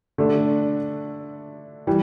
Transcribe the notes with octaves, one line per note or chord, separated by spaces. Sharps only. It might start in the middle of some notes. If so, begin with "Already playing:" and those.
D3 A3 D4
E3 G3